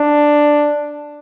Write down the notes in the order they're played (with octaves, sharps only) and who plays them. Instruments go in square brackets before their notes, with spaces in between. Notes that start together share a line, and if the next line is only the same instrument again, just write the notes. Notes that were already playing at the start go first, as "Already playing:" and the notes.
Already playing: [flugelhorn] D4